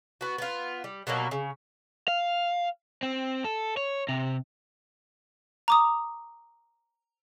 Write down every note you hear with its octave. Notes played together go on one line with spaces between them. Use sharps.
B3 F#4
B3 F4
G3
B2 F#3 G3 A#3
C#3
F5
C4
A4
C#5
C3
A#5 D6 D#6